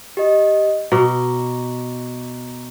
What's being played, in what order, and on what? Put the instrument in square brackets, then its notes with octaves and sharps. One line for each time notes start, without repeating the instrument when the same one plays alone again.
[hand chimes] G4 D#5
[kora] B2 [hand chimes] A#5 C#6 D6